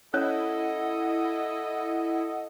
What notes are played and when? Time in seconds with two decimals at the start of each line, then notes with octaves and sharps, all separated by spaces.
0.14 C#4 E4 A4 C#5 D#5 F#5